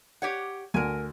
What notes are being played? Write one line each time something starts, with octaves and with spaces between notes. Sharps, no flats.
G4 C#5 F#5
D2 A#4 G#5